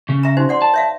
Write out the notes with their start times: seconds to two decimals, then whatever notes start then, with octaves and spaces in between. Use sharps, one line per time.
0.09 C#3 C#4
0.23 E5 A#5
0.37 D#4 F#4 C5
0.49 D5 F#5 C6
0.62 A5
0.74 C#5 E5 F5